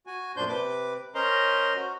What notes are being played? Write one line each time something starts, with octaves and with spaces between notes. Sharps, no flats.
F#4 G#5
F#2 A#2 D4 C5 C6 G6
C3 B4 D6
C#4 A#4 C5 D#5 A#5 C6
F#4